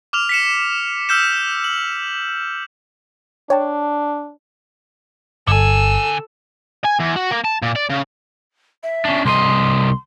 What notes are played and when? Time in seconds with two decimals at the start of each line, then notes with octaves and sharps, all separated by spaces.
0.13 D6 F6 F7
0.29 B6 C#7 E7
1.09 E6 F6 G6 B6 E7
1.64 F#7
3.50 D4 C#5 G5 A5
5.47 G1 D3 A4 G#5 E6
6.85 G#5
7.00 E2
7.16 F#4
7.31 A#3
7.45 A5
7.62 A#2
7.75 D5
7.90 C#3
8.83 E5
9.05 C#4 D4
9.25 C2 D#5 C6